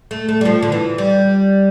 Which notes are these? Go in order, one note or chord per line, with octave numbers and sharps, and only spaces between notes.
A3
A3
G3
F3
D3
E3
G3